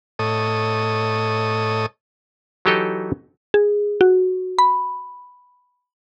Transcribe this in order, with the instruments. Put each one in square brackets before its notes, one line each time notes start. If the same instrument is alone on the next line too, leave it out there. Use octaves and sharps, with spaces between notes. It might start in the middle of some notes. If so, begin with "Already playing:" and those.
[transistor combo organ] A2 A4 C#5 D#5 D#6
[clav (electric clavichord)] E3 F#3 D#4 G4 A4 D#5
[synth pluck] G#4
F#4
B5